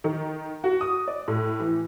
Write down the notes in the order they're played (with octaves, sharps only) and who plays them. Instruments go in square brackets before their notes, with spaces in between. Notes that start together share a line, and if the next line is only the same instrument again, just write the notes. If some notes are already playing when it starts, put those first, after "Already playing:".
[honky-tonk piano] D#3
F#4
D#6
D5
A2
E3